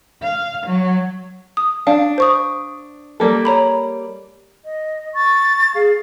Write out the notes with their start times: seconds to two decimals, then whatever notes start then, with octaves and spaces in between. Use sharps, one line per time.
0.22 F5
0.67 F#3
1.57 D#6
1.87 D4 F5
2.18 C5 C#6 D#6
3.20 G3 A#3 A4
3.45 C#5 A#5 B5
4.65 D#5
5.15 C#6 A6
5.75 G#4 F5